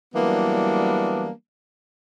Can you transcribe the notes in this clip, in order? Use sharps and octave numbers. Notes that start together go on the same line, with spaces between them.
E3 F#3 G3 A#3 B3 D4